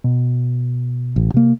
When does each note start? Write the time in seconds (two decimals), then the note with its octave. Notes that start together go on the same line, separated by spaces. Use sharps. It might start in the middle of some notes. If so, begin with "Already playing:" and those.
0.04 B2
1.16 A1
1.34 C3 A#3